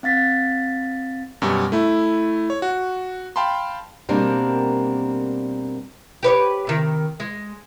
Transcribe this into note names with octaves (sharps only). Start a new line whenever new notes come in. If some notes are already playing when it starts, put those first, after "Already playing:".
C4 F5 A6 B6
F#2 B2 G3
A3 E4
C#5
F#4
F5 G5 A5 B5 C6
B2 G3 A#3 C4 D4 A#4
G4 B4 C#5
C3 D#3
G#3